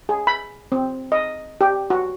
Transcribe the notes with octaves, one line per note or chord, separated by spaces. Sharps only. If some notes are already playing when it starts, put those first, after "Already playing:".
G#4
B5
C4
D#5
G4
F#4